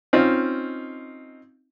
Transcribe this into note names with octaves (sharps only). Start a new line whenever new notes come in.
C4 C#4 D#4 F4